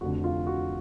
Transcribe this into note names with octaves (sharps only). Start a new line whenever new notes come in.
F1 F2 D3 F#4
F4
F#4